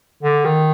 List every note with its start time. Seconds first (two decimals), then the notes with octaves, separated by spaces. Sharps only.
0.23 D3
0.45 D#3